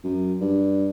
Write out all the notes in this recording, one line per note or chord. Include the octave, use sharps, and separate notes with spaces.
F#2
G2